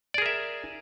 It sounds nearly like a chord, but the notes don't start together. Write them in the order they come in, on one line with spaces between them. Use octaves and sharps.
D5 G#4 A#4 E5